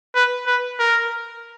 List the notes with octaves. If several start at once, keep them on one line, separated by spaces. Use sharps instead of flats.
B4
B4
A#4